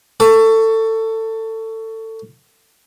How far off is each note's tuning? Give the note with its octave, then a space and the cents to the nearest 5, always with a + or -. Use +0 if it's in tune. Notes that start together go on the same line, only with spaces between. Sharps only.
A4 +20 C#6 +15